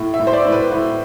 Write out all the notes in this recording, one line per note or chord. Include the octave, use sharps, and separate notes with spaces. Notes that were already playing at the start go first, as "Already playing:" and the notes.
Already playing: A2
E5
A2
C5
D5
A2
B4
A2 B4